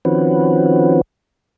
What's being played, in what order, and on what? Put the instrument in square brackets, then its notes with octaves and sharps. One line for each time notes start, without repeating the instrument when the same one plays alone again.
[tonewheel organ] D#3 F3 C4 C#4 F#4 B4